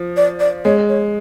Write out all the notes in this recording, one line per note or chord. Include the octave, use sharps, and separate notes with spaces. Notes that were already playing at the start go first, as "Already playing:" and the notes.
Already playing: F3
D5
D5
G#3 C#5
C#5